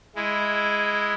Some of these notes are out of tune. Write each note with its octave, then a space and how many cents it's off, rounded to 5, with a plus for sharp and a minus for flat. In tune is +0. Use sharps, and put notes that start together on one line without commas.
G#3 +0 E4 +0